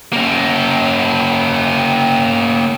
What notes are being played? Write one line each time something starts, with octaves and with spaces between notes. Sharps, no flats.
A#3 C#4